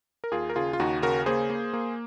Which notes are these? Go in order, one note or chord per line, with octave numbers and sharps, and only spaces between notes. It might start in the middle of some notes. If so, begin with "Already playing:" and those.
A#4
D#2 F4 G#4
A#4
C#3 F4 G#4
F4
D#2 D#4 F#4
C#3 F#4 A#4
A#3 G#4 C5
A#3
A#3